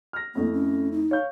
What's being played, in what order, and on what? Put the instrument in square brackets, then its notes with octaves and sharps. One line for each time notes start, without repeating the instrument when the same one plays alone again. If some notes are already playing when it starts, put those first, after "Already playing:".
[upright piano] F6 A#6
[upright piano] F2 A3 E4 [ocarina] A#3
[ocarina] C#4
D#4
[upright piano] C#5 F5 G6